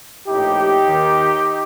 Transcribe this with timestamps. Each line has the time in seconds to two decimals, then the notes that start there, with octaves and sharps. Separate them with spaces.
0.27 A#1 A2 D#4 G4
0.84 D#2 D#3